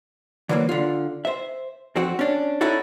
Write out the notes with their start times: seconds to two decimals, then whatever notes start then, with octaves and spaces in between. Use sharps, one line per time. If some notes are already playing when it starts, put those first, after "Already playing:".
0.49 D3 E3 F#3 A3 A#3
0.69 D3 F4
1.25 C5 E5
1.96 F2 C4 F#4
2.19 C#4 D4
2.61 C#4 D#4 E4 F#4 A4